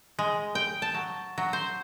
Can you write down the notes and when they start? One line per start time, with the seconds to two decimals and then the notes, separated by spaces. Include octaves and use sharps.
0.19 G#3
0.55 G5
0.82 A5
0.94 F#3
1.38 F#3
1.53 C5